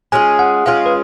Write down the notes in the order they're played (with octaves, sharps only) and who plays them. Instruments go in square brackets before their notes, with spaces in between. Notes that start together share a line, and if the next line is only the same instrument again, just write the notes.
[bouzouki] G#3 C#4 F4 G#4 [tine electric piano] G#5
[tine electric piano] F#5
[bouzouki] G#3 C#4 F4 G#4 [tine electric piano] F5
[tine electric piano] B4